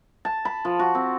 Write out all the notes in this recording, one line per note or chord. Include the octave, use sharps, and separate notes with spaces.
A5
B5
F3
F#4
C4